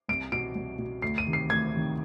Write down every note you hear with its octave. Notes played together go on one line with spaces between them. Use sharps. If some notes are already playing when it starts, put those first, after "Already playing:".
C2 D7
B2 D7
C2
B2
D2 C7
D#7
C3 D#3
C7
D2 G#6
C3 D#3